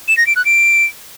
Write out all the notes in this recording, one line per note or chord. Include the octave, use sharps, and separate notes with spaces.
E7
A#6
D7
F#6
D7